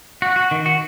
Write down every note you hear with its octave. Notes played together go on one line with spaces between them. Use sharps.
F#4
F#4
D#3
F#4